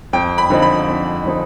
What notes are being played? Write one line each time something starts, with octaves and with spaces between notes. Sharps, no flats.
F2 G5
B5
D3 F3 C4 D#4
B5
F2
D3 F3 C4 D#4